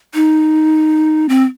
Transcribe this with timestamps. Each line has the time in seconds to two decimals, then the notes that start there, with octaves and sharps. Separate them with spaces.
0.14 D#4
1.29 C4